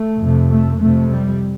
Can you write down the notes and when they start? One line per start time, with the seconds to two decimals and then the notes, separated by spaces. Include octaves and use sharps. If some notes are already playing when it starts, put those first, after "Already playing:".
Already playing: A3
0.20 F2 C3
0.51 A3
0.82 F2 C3 A3
1.12 G3